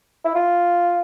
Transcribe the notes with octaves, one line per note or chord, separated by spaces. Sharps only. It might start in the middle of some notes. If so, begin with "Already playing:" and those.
E4
F4